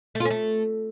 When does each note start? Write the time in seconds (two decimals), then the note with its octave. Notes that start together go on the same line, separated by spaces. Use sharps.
0.15 A3
0.20 F4
0.25 C#4
0.30 A3